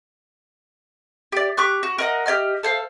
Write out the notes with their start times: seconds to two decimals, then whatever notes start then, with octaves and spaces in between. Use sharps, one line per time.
1.32 G4 D5
1.57 G4 C#6 D6 F#6
1.83 F#4
1.98 A#4 D#5 F#5
2.26 G4 C#5 D#5 F6
2.63 A4 C5 F5